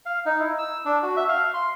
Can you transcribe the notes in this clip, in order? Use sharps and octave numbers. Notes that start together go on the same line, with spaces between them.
F5
D#4
E4
E6
D4
F#4
E5
F5
C6